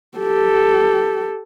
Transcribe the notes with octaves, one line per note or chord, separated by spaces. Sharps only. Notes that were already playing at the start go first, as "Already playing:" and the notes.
G4 A4